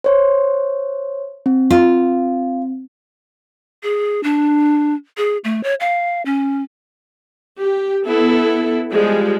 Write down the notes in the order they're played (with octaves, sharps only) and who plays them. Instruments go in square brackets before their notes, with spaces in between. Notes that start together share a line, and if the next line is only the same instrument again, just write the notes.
[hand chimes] C5 C#5 C6
C4
[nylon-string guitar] F4
[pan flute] G#4
D4
G#4
A3
C#5
F5
C#4
[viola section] G4
B3 E4 A4
F3 G3 G#3